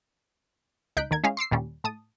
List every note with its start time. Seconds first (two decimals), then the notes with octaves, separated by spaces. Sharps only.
0.97 C#2 D#4 F#6 G6 B6 D7
1.11 D#2 D#3 A#4 G#6
1.24 G#3 C#4 E4 G#4 F5
1.37 C6 D6 E6 C7
1.51 D#2 A#2 G3 C#4
1.84 A2 A5 D#6